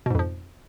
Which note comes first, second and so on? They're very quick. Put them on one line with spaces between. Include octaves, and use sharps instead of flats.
B2 G#2 F2 F3